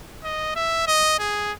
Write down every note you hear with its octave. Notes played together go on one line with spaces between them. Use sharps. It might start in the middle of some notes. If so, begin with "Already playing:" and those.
D#5
E5
D#5
G#4